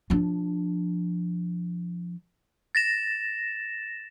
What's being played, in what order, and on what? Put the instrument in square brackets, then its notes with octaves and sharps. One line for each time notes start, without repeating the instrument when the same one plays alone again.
[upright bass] F3 D4
[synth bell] A6 A#6 E7